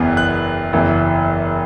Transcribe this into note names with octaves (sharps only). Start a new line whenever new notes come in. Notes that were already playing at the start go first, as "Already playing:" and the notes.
Already playing: F#1 E2 E3 B3
F#6
F#1 E2 E3